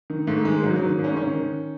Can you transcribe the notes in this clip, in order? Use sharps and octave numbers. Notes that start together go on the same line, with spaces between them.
D#3
G#2 A3
D#3 G#3
G#2 F#3
D#3 F#3
G#2
C#4
D#3 C#4
D#3